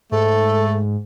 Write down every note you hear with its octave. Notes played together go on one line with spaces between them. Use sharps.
G#2 A3 A4